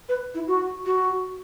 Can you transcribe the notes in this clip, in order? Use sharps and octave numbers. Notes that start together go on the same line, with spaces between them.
B4
E4
F#4
F#4